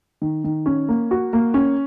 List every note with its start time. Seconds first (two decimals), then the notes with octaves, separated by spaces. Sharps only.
0.22 D#3
0.44 D#3
0.66 C#4
0.88 A#3
1.11 F#4
1.33 A#3
1.54 C#4